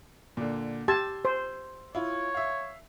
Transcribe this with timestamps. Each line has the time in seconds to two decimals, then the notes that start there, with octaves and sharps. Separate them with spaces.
0.37 A#2 D3
0.88 G4 A5 C6 E6 G#6
1.25 C5
1.95 E4 F4 C#5
2.34 E5 F5